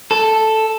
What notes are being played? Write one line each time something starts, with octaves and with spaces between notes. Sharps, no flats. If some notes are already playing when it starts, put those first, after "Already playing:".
A4